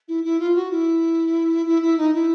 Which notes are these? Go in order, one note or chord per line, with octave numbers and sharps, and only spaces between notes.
E4
E4
F4
F#4
E4
E4
E4
D#4
E4